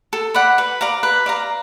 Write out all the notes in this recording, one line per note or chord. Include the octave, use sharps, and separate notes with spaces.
A4
D5 F#5 B5
B4
D5 F5 A#5
B4
D5 F5 A#5